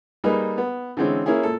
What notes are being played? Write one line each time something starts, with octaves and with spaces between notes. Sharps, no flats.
G3 A#3 D#4 G#4 B4
B3
D3 E3 G#3 C4 C#4
A#3 C#4 E4 G#4
A#2 A4